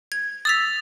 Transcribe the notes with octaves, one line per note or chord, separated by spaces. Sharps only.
G#6
D#6 E6 A6 B6 F7